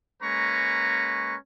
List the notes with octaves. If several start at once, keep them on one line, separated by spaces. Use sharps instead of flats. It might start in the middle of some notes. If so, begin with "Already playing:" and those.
G#3 A#3 C#4 B4 A#5 C#6